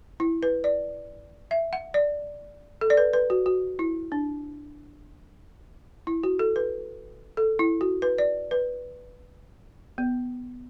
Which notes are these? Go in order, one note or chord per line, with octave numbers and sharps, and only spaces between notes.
E4
B4
D5
E5
F#5
D5
A4
D5
B4
B4
F#4
F#4
E4
D4
E4
F#4
A4
B4
A4
E4
F#4
B4
D5
B4
B3